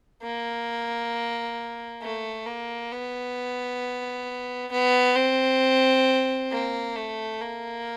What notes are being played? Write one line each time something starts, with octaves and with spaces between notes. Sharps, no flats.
A#3
A3
A#3
B3
B3
C4
A#3
A3
A#3